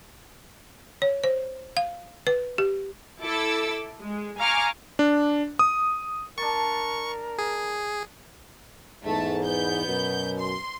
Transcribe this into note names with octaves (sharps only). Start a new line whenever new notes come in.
C#5
C5
F5
B4
G4
E4 A4 D6 E6
G#3
F5 G#5 A#5 C#6 D6 F6
D4
D#6
D4 A#4 A5 C#6
G#4
E2 G#2 A3 A5
B3 G6
F#2 B2
C6